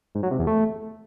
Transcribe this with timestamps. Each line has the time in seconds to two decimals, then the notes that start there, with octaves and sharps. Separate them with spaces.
0.15 G#2
0.23 F#3
0.31 C3
0.39 E2
0.47 A3